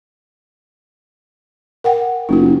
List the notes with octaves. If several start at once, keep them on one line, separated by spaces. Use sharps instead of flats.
A#4 F#5 G5
F#1 D#4 F4